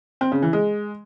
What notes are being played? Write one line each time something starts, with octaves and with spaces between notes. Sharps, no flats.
C4
C#3
E3
G#3